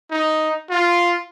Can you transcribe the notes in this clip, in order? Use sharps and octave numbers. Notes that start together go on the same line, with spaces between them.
D#4
F4